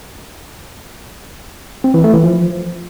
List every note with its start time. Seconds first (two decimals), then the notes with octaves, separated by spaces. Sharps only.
1.84 C4
1.94 E3
2.04 A3
2.14 E3
2.24 F3